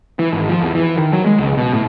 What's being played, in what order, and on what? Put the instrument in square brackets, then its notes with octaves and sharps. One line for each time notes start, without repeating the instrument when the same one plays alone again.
[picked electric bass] E3
G#1
F3
E2
E3
D#3
F#3
G#3
C#2
B2
A2